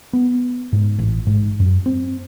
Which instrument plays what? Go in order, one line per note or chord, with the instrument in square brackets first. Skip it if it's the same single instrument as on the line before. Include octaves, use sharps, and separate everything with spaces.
[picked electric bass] B3
G#2
A1
G#2
F#2
C4